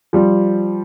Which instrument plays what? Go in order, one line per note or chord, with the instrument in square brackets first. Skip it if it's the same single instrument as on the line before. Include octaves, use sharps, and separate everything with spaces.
[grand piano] F3 G3